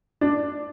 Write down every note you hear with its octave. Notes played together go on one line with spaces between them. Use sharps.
D4